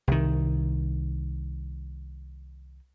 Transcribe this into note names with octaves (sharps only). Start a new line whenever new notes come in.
C2 D#3